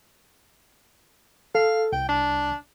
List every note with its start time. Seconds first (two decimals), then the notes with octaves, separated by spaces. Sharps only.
1.55 A4 F5
1.93 C2 G5
2.08 D4